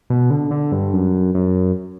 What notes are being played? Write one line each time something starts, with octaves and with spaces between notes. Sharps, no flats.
B2
D3
D3
G2
F#2
F#2